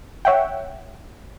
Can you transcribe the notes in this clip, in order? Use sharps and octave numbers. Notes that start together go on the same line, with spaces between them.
C#5 E5 F#5 G5